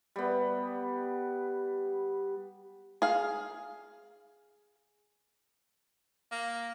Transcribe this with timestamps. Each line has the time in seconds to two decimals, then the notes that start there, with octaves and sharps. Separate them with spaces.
0.16 G3 B3
3.02 G#4 F5
6.32 A#3